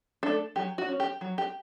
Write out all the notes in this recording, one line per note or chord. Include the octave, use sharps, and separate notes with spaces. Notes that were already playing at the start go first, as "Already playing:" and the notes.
A3 D4 A4
F#3 G4
F#4
C#4
G4
F#3
G4